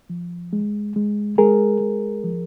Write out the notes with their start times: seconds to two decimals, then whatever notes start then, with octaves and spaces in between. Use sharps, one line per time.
0.10 F3
0.53 G#3
0.96 G#3
1.38 G#3 G#4 A#4
1.80 G#3
2.24 F3